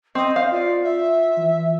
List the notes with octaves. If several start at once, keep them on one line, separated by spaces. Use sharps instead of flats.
C4 D#5
C5 F5
F4 D5
E5
E3